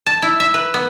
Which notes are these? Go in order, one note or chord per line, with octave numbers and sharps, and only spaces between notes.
A5
E4
E5
B4
B3